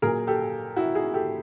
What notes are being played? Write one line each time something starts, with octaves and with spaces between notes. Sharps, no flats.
A#2 F#3 G#4 A#4
G4 A4
E4 F#4
F#4 G#4
G4 A4